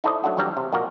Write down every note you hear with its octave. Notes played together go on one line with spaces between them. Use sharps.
D#4 E4 A4 C5 D5 D#5
F#3 A3 D4 F#4
F2 E3 F#3 G3 D4 A#5
C3
F2 A#2 F#4 A#4